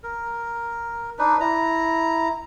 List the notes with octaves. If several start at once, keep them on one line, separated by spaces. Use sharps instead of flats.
A#4
D4 D#4 B4
E4 A#5